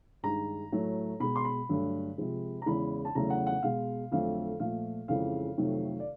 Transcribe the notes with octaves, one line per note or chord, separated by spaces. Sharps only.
G2 D#3 G#3 A#5
A2 F#3 A3
B2 G#3 B5
C6
B5
G2 D3 F#3 A3
C3 F3 G#3
A#5
E2 C#3 E3 G#3 B5
A5
E2 C#3 F#3 A3 A#5
F#5
F#5
B2 G#3 F5
F2 D3 F#3 A3 F5
A#2 F3 A3 F5
F2 C#3 E3 G#3 F5
F2 C3 D#3 F#3 A3
D5